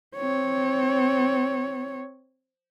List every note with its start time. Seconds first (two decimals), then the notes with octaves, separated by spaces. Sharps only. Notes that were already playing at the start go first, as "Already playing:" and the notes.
0.16 C4 C#5